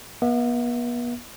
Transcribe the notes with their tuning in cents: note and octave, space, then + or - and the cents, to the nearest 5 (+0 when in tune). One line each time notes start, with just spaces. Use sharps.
B3 -40 E5 +0